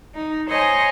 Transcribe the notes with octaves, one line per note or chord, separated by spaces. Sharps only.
D#4
C5 C#5 D#5 G#5 A#5